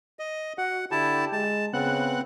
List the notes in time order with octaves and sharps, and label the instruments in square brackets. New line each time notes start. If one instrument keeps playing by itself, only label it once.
[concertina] D#5
[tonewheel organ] F#4 [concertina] F#5
[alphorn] D3 [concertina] E4 A5 [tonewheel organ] G4
[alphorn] G#3 [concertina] A5
[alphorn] C#3 [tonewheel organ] B3 F#6 [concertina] C4 F#5